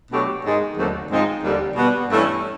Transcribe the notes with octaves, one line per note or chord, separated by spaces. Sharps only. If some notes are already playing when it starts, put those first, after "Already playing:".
B2 F#3 A3 D4 G4
G#2 D#3 G#3
D#2 D3 F#3 A3 C4
G#2 F3 G#3 C4 D#4
D#2 D3 G3
B2 G3 B3
G2 E3 A3 C#4 E4